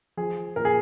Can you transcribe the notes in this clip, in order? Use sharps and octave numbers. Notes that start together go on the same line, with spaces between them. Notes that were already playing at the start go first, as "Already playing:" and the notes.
F3 G#4
A#2 A#4
G#4